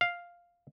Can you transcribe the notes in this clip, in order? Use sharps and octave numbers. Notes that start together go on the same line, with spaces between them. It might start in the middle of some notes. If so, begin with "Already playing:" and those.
F5